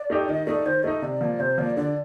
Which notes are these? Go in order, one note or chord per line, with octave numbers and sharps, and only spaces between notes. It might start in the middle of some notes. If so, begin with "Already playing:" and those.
Already playing: D5
A3 D#4 G4
D#3 D#5
A3 D#4 D5
D#3 C5
A3 D#4 D#5
C3 D5
F3 A#3
C3 C5
F3 A#3 D5
D3 D5